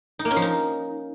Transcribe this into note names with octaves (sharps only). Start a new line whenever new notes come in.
D#4
A#3
C#4
F3
D#4